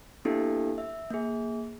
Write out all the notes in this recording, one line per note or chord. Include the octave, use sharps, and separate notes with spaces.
A#3 B3 D4 E4 G4 A4
E5
A#3 G#4